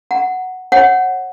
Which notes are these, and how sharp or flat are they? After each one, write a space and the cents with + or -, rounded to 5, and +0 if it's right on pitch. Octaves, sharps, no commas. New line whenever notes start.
F#5 +0 A#5 +0
C#5 -35 F#5 +0